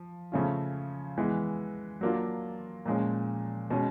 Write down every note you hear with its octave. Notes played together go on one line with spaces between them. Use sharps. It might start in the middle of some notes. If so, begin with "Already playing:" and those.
Already playing: F3
C#3 F3 A3 C#4 F4
E3 G#3 B3
F#3 A#3 D4 F4
A#2 F3 G#3 C#4
B2 G#3 C#4